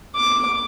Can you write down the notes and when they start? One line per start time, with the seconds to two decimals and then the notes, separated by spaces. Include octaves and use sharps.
0.16 D6